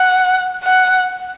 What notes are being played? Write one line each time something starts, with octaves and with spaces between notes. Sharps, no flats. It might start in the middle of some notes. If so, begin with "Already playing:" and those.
Already playing: F#5
F#5